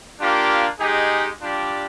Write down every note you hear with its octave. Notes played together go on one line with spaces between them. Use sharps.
A#3 D4 F4 G4
G#3 D#4 G4 G#4
G3 D4 F4 G4